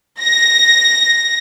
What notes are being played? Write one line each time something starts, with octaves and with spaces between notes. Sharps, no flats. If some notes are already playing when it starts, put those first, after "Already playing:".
A#6